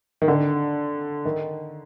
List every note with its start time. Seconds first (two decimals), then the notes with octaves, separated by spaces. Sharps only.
0.22 D#3
0.28 D3
1.25 D#3